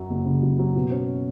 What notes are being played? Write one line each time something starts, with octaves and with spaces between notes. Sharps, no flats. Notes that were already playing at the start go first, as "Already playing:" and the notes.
Already playing: F#2 F#3
F#1
C#3
F#2
F#3
B2
C#4